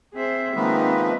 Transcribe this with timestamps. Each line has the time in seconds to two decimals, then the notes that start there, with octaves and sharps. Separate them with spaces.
0.14 C4 G#4 C5 E5
0.56 D#3 F3 G#3 A#3 B3 D#4 B4